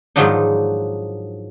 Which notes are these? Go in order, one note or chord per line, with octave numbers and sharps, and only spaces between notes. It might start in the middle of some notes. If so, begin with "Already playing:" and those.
G#2 D#3 F3 F#3 D4 D#4